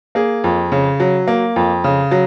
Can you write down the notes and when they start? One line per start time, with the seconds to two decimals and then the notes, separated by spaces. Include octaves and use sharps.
0.15 A#3 G#4
0.44 F2
0.72 C#3
1.00 F#3
1.27 A#3
1.56 F2
1.84 C#3
2.11 F#3